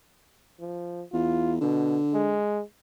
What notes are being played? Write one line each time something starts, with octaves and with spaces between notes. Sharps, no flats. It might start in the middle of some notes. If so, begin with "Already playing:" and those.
F3
E2 F4
B2 D3
G#3